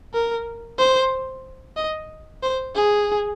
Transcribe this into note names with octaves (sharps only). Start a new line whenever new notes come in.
A#4
C5
D#5
C5
G#4